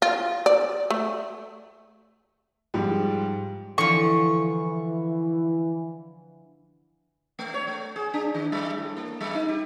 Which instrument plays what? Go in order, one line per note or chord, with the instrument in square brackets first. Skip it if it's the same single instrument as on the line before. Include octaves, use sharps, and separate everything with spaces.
[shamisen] F4
D5
A3
[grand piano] G#2 F3 G3
[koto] D3 F3 [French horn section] E3 [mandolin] C#6
[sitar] A3
C#5
A3
G#4
D4
D#3
G3
A2
A#3
G3
D#4
G4